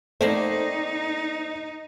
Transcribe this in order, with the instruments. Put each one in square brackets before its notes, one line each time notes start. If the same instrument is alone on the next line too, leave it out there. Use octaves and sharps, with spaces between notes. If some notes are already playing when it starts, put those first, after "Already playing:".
[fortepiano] A3 [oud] A#3 C4 [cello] D#4 [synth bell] C5 D5 C7